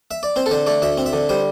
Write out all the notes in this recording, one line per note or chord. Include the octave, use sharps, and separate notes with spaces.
E5
D5
C4 C5
A4
D3 C5
A3 D5
D2 E5
C4
E5
D3
G3 C5